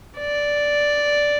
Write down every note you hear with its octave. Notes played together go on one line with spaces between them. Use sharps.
D5